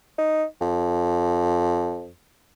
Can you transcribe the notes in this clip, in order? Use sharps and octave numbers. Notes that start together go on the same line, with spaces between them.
D#4
F2